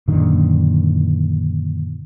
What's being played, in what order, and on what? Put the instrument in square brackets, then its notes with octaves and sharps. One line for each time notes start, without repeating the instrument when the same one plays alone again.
[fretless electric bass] F#2 A#2 D3 D#3